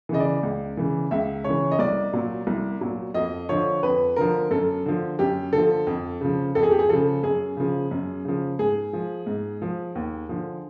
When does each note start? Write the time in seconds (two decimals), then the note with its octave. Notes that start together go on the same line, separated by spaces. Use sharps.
0.09 C#3 E3 D#5
0.20 D5
0.43 C#2
0.77 C#3 E3
1.11 C#2 E5
1.44 C#3 E3 C#5
1.71 D#5
1.79 C2 D5
2.13 A#2 F#3
2.47 C2
2.81 A#2 F#3
3.14 F2 D#5
3.49 D3 F3 C#5
3.83 F2 B4
4.16 D3 F3 A#4
4.51 F#2 A4
4.86 D3 F3
5.19 F#2 G4
5.53 D3 A4
5.58 F3
5.87 F2
6.21 C#3 F3
6.55 F2 A4
6.63 G#4
6.71 G4
6.79 G#4
6.89 C#3 F3 A4
7.23 F#2 G#4
7.57 C#3 F3
7.91 F#2
8.25 C#3 F3
8.59 G#2 G#4
8.93 F3
9.26 G#2
9.62 F3
9.95 D#2
10.29 D3 F3